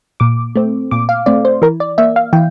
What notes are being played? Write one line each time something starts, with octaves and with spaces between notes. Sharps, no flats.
A#2 D6
A3 C4
A#2 D6
F5
A3 C4 D5
C5
E3 A#4
D5
A#3 E5
F5
E3 G5